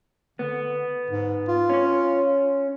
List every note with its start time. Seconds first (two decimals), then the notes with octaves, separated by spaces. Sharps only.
0.39 D3 B3
1.10 G#2
1.48 F4
1.70 C#4 C#5